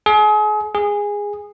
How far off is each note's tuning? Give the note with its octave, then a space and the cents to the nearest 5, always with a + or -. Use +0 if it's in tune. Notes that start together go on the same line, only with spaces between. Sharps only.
G#4 +35
G#4 -15